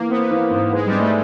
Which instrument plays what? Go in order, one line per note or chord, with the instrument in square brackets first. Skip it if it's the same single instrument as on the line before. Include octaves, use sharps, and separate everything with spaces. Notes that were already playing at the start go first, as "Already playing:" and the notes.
Already playing: [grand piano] E3 [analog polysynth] A#3
[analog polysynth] B3 [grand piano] C4
[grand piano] E3
G#2
[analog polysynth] G#3 [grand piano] B3
[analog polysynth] G3
[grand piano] G#3
[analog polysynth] A3